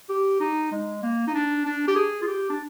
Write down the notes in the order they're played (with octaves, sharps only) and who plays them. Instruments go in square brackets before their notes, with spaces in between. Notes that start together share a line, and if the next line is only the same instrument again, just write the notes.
[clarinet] G4
D#4
G#3
A#3
D#4
D4
D4
G4
G#4
F4
G4
D4